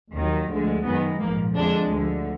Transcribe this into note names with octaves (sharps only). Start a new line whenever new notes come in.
D#2 D#3 F#3
D2 D3 F3 G#3
F#2 D#3 G#3 B3
A#1 G#2 F3 A#3
F2 D3 F3 G#3 D4
D2 D3 F3